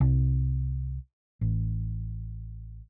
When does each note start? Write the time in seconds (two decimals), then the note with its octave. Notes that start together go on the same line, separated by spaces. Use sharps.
0.01 C2
1.41 A1